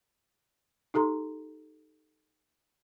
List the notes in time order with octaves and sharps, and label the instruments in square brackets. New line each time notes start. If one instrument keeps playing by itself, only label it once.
[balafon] D#4 G4 A4 A#5 C6